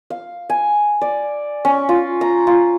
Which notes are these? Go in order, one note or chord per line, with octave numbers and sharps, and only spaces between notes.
F5
G#5
D5
C#4
F4
A#5
F4